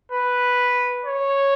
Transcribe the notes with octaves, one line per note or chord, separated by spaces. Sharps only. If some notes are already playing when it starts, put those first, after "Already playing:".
B4
C#5